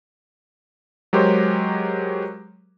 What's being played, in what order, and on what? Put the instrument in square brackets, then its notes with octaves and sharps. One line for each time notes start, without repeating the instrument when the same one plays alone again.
[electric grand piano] F#3 G#3 G4 A#4 C5 C#5